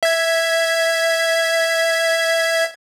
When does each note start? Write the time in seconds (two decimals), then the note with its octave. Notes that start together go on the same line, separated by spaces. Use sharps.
0.03 E5 G#6